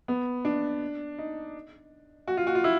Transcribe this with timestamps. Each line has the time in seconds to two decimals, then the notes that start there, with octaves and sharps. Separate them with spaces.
0.08 B3
0.45 D4
1.18 D#4
2.28 F#4
2.37 F4
2.47 F#4
2.55 F4
2.64 E4